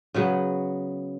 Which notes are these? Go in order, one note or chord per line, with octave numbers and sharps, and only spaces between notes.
C#3 F#3 B3